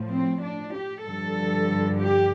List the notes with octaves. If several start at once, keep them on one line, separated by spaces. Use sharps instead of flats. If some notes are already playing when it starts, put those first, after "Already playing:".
Already playing: A2 F3
C4
D4
G4
G2 D3 F3 A4
G4